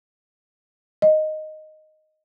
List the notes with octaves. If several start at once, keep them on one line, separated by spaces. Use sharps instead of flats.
D#5